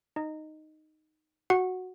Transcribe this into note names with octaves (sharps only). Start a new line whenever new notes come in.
D#4 D#5
F#4 F#5